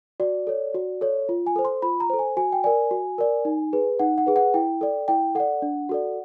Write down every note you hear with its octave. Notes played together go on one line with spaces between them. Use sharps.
F#4 D5
A4 C#5
F#4
A4 C#5
F4
G#5
A4 C5
C6
F4 B5
A#5
A4 C5
G#5
F#4 G#5
G5
A#4 D5 G#5
F#4
A#4 D5
D#4
G#4 B4
D#4 F#5
F#5
G#4 B4
F#5
E4 G5
A4 D5
E4 G5
A4 D5 F#5
D4
F#4 A4 D5